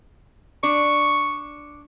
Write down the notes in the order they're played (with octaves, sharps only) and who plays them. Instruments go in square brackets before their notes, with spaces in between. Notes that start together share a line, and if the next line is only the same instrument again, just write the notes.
[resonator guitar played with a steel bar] D4 [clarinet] C#6